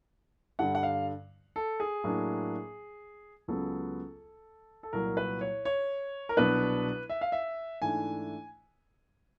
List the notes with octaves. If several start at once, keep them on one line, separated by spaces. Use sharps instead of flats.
G2 D3 G3 F#5
F#5
F5
A4
G#4
A2 F#3 A#3 D4
C#2 C#3 F#3 B3 A4
A4
C2 A#2 F#3 A#4
B4
C#5
C#5
A#4
C2 B2 F#3 B3 D4 B4
E5
F5
E5
G#2 E3 A3 D4 G#5